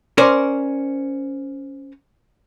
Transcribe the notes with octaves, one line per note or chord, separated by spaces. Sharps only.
C#4 A#4 C5 D5